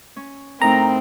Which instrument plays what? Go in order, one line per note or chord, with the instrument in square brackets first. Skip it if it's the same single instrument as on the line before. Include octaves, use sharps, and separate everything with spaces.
[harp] C#4
[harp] A2 D#4 A#4 [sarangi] C4 [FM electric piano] A#5